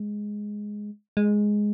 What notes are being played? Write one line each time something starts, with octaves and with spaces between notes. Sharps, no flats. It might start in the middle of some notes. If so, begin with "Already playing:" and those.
Already playing: G#3
G#3